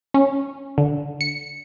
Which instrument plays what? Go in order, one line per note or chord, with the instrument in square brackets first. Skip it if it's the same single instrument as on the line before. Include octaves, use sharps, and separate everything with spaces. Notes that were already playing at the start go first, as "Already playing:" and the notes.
[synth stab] C#4
D3
C#7